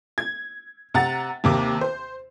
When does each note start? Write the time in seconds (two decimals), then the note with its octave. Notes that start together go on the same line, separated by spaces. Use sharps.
0.18 G#6
0.94 C3 F#5 A#5 A6
1.44 D#2 C3 A#3 D6
1.81 C5